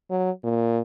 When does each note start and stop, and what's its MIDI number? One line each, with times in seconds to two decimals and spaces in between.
0.11 0.31 54
0.44 0.82 46